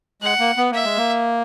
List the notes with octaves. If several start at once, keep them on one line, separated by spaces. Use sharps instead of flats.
G#3 F#5
A#3
B3
A#3 E5
G#3
A#3